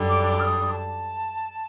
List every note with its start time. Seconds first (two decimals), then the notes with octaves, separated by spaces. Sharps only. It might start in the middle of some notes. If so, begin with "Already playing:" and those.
Already playing: F#2 D3 G3 D4
0.09 D6
0.24 D6
0.40 F6
0.43 D#6
0.71 A5